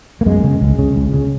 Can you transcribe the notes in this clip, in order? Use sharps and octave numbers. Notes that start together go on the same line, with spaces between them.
A#3
F#2 G#3
C#3
C#2
C#3
C#2
C#3